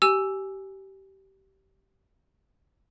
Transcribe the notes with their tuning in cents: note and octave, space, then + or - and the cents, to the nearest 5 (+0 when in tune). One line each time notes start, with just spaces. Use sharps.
G4 -20 G#5 +0 E6 +0